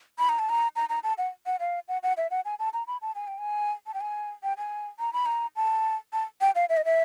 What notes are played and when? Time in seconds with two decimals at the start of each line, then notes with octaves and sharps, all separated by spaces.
0.19 B5
0.29 A#5
0.39 A5
0.49 A#5
0.76 A#5
0.89 A#5
1.04 A5
1.18 F#5
1.46 F#5
1.60 F5
1.88 F#5
2.03 F#5
2.17 E5
2.31 F#5
2.45 G#5
2.59 A5
2.73 A#5
2.87 B5
3.02 A5
3.15 G#5
3.28 G5
3.38 G#5
3.87 A5
3.94 G5
4.01 G#5
4.43 G5
4.58 G#5
4.99 A#5
5.13 B5
5.26 A#5
5.56 A5
6.13 A5
6.41 G5
6.55 F5
6.69 E5
6.77 D#5
6.85 E5